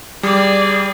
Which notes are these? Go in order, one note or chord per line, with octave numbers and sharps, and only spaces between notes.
G3 G#4 D5